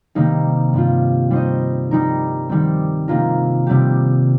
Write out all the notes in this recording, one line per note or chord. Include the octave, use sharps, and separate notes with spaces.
C3 D#3 G3 A#3 D#4
G2 G3 C4 F4
G3 D#4 C5 D#5
G3 D#4 A#4
D#3 G3 C4
C3 D#3 A#3 F4 A#4
C3 G3 C4 G4